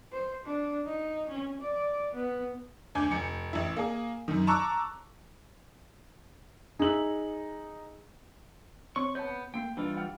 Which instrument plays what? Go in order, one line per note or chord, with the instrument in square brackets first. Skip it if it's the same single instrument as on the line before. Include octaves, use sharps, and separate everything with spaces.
[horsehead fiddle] C5
D4
D#4
C#4
D5
B3
[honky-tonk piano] D2 G#5 D6 G6
F1 C#7
A1 E4
A#3 G#4
F#2 D#3
A5 A#5 C#6 D6 E6 F#6
[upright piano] D#4 F#7 [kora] G#4 E5
[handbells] C4 C#5 C6 [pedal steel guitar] C#6
[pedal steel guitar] B3 G6 [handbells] C#5 A5
[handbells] A3 A#3 C7 [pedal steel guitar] G5
[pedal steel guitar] E3 G3 F4 [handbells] D4 D#4 B4
[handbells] F#5 G5 F6